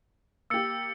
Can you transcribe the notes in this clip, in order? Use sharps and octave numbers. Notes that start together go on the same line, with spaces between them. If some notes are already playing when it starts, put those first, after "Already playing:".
A#3 G4 E6 A6 C#7